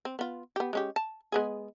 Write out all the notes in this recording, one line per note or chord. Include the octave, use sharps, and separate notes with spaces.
C4
B3 F4
B3 G4
G#3 C#4 G4
A5
G#3 B3 G#4